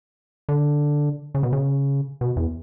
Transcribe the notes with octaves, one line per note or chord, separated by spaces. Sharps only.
D3
C#3
B2
C#3
B2
E2